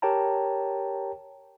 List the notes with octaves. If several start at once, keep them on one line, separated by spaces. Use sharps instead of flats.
G4 A#4 C#5 G5 A5 A#5